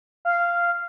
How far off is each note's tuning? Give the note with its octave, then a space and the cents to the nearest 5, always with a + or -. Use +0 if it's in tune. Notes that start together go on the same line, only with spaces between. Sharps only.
F5 -10